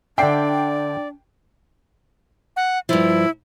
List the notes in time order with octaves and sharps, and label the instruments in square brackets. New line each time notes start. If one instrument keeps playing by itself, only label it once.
[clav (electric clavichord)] D3 E5 [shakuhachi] D4 [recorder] D5 [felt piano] G5 C7
[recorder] F#5
[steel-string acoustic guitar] G2 F3 [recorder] E4